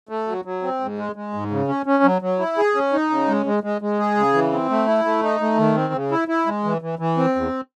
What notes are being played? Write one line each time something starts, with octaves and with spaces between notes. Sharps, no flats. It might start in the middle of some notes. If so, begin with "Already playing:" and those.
A3
F#3
F#3
C4
G#2
G#3
G#3
G#2
C#3
C#4
C#4
F#3
F#3
E4
G#4
C#4
D#4
C#3
G#3
G#3
G#3
G#3
G#4
C#3
E3
C4
A3
E4
A3
D#4
A3
D#3
C4
C#3
E4
E4
G#3
E3
E3
E3
C4
E2